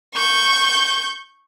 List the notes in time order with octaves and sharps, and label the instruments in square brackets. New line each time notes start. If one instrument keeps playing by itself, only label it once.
[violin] C#6 G6